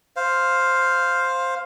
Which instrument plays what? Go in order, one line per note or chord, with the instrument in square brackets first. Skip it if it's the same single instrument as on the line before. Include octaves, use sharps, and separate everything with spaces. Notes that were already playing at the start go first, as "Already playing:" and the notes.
[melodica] C5 F5